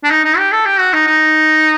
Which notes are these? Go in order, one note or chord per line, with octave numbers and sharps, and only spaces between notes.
D4
D#4
D#4
G4
A4
G4
F#4
D#4
D#4